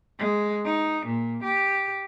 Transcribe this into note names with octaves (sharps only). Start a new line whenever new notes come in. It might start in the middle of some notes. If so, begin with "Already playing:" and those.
G#3
D#4
A#2
G4